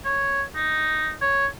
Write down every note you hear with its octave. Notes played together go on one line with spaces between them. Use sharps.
C#5
D#4
C#5